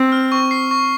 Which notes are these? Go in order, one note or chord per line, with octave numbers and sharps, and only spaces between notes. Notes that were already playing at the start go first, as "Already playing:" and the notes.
Already playing: C4
F6
C#6
C7
C#6